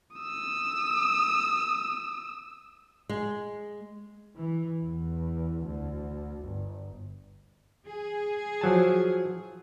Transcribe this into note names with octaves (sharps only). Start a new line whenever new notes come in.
D#6 E6
G#3
E3
E2
D2
G1
G#4
F3 F#3 A5